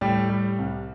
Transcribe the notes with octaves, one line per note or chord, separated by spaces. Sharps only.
A2 G3 G4
G3
C2